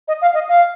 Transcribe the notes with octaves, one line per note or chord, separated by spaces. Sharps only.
D#5
F5
D#5
F5